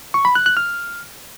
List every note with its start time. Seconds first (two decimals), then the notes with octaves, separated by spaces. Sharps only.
0.14 C#6
0.25 B5
0.35 F#6
0.46 F#6
0.57 F6